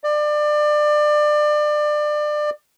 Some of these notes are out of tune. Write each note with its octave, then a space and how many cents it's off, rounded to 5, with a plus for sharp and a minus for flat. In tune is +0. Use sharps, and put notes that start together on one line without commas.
D5 +25